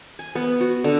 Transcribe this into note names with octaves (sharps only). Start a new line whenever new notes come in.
G#5
B3
F#4
D3